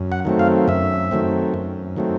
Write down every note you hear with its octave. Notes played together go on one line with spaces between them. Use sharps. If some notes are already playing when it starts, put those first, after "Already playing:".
Already playing: F#2
F#5
D#3 F#3 A3 C4
F5
F#2 E5
D#3 F#3 A3 C4
F#2
D#3 F#3 A3 C4